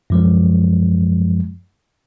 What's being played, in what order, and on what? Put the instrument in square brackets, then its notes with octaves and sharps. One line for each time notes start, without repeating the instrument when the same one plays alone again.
[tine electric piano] F#2 F3 G#3